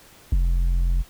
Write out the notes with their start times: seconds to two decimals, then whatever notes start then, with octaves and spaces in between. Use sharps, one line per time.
0.32 F1